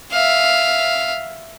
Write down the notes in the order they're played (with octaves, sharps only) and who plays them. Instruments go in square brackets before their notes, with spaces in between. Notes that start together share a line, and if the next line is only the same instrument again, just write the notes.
[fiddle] E5 F5